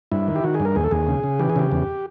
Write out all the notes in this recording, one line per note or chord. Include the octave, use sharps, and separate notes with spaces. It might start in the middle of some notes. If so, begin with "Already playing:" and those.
G2 E4
D#3
G4
D#3 F#4
G#4
G2
A#4
D#2 G#4
A4
D#2 G#4
C#3
C#3
E3 G4
G#4
C#3 G4
E2